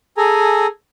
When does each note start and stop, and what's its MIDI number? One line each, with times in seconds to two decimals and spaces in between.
0.17 0.66 68
0.17 0.66 69
0.17 0.66 80
0.17 0.66 82